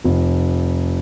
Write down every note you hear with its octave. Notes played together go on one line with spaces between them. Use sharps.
F1